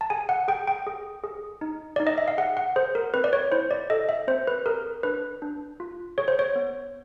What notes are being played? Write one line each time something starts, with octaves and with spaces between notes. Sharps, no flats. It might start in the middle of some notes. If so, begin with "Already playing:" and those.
A5
G#4 G#5
F#5
G#4 G5
G5
G#4
G#4
D#4
D#4 D5
D#5
E5
F5
G#4 F#5
F#5
G#4 C5
A#4
C4 B4
D5
C#5
E4 C5
D5
A4 D#5
E5
C4 C5
B4
G#4 A#4
D4 B4
D4
F4
G#4 C#5
C5
C#5
B3